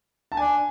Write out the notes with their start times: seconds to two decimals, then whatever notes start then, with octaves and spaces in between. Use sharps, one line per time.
0.32 A5
0.37 D4 G#5